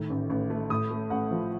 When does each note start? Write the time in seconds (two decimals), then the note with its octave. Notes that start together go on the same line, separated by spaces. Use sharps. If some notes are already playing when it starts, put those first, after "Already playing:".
Already playing: A2 D#3
0.10 A1
0.30 A1
0.50 A3
0.70 A2 D#6
0.90 A3
1.10 A1 F#5
1.31 F3